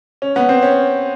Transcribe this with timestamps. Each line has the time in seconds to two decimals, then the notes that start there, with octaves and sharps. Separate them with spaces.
0.22 C#4
0.36 B3
0.49 C4
0.63 C#4